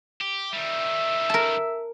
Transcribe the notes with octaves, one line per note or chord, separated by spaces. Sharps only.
G4
D#3 G3 E5
A#4 A5